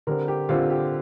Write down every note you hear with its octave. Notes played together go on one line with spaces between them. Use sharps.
D3 G3 C4 A#4
G4
D3 G3 C4 F4
G4